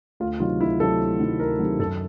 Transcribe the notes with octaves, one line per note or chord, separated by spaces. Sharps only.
D2 F4
C3 D#3 F#3 F4
D2 E4
C3 D#3 F#3 A4
D2
C3 D#3 F#3
D2 A#4
C3 D#3 F#3
F#2 A4